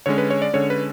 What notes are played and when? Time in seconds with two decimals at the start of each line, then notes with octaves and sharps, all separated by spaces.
0.06 D3 G#3 C#4 C#5
0.18 B4
0.30 C#5
0.42 D5
0.53 D3 G#3 C#4 C#5
0.70 B4